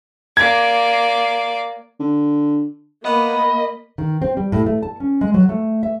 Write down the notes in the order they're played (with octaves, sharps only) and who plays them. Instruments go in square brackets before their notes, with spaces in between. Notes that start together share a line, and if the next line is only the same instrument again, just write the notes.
[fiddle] A#3 D5 [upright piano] G#6
[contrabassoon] D3
[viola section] A#3 [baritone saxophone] B3 [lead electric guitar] D#5 [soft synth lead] B5
[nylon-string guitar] D#3
C4
G3
A2
A3
A5
C#4
G#3
F#3
A3
E5